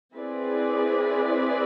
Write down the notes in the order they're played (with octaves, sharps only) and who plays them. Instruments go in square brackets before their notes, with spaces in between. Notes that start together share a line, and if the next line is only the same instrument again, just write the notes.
[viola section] C4 E4 G#4 B4 D5